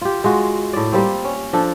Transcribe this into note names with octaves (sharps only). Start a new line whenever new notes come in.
F4 G4
G#3 F4 F#4
A2 D5
G3 A#3 C4
C#4
F3 D4 A4